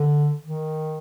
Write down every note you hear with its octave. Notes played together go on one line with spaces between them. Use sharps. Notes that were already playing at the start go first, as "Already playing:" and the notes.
Already playing: D3
D#3